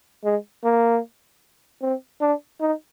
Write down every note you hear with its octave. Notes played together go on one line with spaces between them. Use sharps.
G#3
A#3
C4
D4
D#4